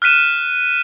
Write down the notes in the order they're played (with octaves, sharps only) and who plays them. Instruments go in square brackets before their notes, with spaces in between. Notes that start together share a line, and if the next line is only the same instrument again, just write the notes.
[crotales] F6 F#6 B6 D#7 E7